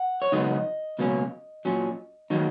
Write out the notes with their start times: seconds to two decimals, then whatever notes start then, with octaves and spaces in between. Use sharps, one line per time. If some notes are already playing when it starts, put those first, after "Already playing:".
Already playing: F#5
0.22 C#5
0.32 C#2 C#3 F#3 B3 D#4 D#5
0.99 C#2 B2 F#3 A#3 C#4
1.65 A#2 F#3 C#4
2.30 D#3 F#3 A#3 D#4